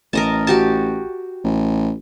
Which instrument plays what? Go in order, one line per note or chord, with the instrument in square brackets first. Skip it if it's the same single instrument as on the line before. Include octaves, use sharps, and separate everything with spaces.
[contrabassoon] A1 [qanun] A#4 D#5 A5
[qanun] F#4 G4 A5
[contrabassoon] A1